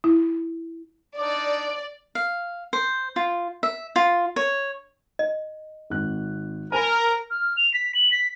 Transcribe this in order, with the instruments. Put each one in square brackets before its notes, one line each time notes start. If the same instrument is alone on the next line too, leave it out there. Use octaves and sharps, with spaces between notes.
[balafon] E4
[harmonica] D4 D#4 D6 [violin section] D5
[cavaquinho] F5
C5
F4
E5
F4
C#5
[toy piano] D#5
[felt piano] G#1 C4 F#6
[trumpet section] A#4 [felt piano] C5 G#5 B5 [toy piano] A5
[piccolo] F6
F7
B6
F#7
B6